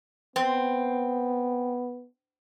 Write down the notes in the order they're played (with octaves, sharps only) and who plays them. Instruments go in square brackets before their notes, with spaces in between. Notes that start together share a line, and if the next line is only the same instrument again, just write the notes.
[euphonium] B3 [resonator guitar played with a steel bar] C4